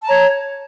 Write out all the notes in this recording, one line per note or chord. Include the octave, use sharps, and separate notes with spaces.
C#5 A5 A#5